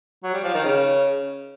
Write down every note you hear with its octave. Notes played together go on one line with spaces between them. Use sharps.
F#3
G3
F3
D#3
C#3